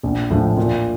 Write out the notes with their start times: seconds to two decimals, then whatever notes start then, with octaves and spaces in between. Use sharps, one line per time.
0.03 A#1
0.30 A2 F3
0.57 A#2